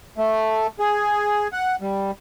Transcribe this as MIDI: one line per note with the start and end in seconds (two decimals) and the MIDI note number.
0.18 0.67 57
0.79 1.48 68
1.53 1.76 78
1.81 2.11 55